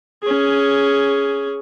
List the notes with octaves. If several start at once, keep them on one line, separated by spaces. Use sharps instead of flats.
C#4 G#4